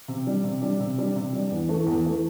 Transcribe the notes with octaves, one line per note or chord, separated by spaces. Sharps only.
C3
G3 D4
C3
G3 D4
C3
G3 D4
C3
G3 D4
E2
E3 A3
E2
E3 A3